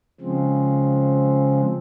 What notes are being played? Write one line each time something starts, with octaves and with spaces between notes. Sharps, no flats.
C#3 F3 G#3 C4